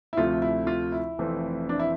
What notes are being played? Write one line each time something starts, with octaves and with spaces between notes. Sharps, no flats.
E4
D2 C3 F3 A3 F4
E4
F4
E4
F1 F2 E3 A3 C4
D4
E4